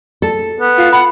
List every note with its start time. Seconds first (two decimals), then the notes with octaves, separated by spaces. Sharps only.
0.22 A4
0.60 B3
0.78 F4
0.93 F#5 B5